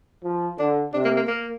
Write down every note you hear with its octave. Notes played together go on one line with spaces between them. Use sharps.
F3
D3 D4
C3 D4
A#3
A#3
A#3